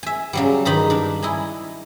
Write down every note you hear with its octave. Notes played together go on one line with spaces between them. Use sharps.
E5 G#5
C#3 F#3 G3
G2 D#3 D#4 B5
D4 A#4
E4 D#5 G#5